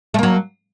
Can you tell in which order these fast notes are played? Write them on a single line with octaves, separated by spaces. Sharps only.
A3 A#3 F#3